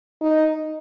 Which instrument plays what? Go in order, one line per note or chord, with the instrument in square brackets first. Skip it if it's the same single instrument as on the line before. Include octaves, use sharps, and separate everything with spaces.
[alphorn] D#4